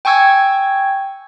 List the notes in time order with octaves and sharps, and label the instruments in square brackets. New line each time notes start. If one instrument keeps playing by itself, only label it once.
[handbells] G5 G#5 C#6 E6 G#6